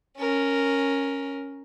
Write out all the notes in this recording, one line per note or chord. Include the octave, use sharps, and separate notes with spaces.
C#4 A#4